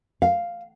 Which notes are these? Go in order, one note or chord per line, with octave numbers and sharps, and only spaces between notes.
F5